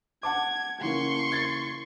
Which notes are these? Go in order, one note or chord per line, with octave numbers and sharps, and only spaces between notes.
F#5 A5 D6 G#6
C#3 E3 A#3 C6 C#6
G#6 A6